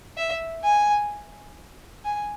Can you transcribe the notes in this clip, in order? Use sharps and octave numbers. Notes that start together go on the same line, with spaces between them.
E5
G#5
G#5